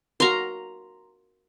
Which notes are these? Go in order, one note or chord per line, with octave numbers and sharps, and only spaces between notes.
F#4 A#4 A#5 C6